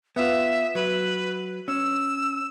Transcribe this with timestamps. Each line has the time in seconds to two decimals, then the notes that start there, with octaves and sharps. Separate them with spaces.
0.16 B3 F4 E5
0.75 F#3 B4
1.68 C#4 E6